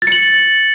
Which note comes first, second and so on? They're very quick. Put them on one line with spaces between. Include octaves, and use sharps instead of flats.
A6 C#7 F#7